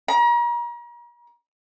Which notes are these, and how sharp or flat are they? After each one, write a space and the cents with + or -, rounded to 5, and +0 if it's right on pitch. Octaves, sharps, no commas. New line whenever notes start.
A#5 +40